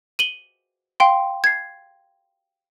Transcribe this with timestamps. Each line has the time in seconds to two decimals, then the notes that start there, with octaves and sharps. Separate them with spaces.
0.19 D#7 F#7 G7
1.00 F5 G5 C6
1.44 G#6 C7